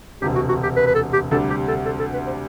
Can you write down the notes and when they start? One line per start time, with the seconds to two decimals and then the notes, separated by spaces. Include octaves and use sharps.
0.22 E1 D2 C3 G4
0.35 F#4
0.49 F#4
0.63 G4
0.76 B4
0.87 B4
0.95 A4
1.13 G4
1.31 D2 C3 G3 D4 A4
1.50 G4
1.68 A4
1.86 A4
2.00 A4
2.13 B4
2.27 C5